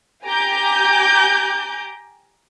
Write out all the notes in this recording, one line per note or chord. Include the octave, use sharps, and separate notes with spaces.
G4 G#5 A#5 D6 G6